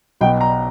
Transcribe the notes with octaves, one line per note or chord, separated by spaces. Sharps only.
B1 B2 G5
A#5